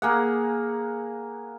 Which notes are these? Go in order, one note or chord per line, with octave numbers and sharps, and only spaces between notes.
A#3 G#4 F#5